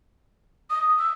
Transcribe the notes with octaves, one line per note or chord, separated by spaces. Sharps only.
D#6
E6